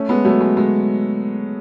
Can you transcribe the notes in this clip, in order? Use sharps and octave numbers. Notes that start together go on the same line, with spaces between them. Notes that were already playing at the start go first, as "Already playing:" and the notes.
Already playing: A3 C#4
G#3 B3
F#3 A3
G#3
G#3